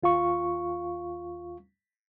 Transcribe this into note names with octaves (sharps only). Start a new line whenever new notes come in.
D#2 F4 F5 C#6